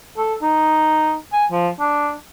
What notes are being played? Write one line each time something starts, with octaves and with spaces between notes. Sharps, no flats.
A4
D#4
G#5
F3
D4